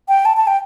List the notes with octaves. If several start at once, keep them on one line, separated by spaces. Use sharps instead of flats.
G5
A5
A5
G5